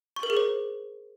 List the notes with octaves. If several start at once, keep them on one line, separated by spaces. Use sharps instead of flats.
C#6
A#4
G#4
C5